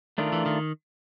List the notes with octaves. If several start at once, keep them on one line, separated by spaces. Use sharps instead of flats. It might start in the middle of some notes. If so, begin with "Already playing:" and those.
D#3 A3 D4 F4 A#4
E3
D#3